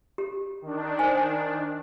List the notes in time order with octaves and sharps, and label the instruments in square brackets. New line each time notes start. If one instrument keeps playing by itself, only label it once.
[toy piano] G4
[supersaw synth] D#3 D4
[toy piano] C5 G#5